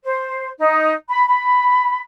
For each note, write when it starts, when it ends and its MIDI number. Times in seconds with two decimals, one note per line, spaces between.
0.04 0.48 72
0.59 0.92 63
1.08 1.25 83
1.26 2.00 83